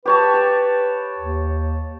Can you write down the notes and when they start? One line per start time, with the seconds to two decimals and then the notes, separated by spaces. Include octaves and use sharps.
0.06 G4 B4 C#5 A5
0.34 A5
1.18 D#2